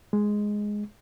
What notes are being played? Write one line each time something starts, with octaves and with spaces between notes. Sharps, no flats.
G#3